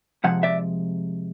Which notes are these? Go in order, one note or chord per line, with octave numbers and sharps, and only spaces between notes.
C3 F3 G#3 F#5
D5 E5